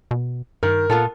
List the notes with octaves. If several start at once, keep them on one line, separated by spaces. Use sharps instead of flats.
B2
G2 D#3 A#4
A#2 B3 F4 A4